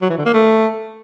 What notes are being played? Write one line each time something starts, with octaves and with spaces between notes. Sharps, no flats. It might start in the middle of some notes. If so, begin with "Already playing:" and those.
F#3
E3
D3
A#3
A3